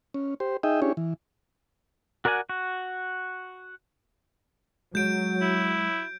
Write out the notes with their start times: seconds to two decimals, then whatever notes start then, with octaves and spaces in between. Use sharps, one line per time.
0.14 C#4
0.40 G4 C5
0.63 D#4 G#4 D#5 E5 G5
0.82 C#4 D4 E4 G4 G#4 C#5
0.97 E3
2.25 F#4 A#4 D5 F#5 G#5
2.49 F#4
4.95 F#3 G#3 G6 D7
5.42 E4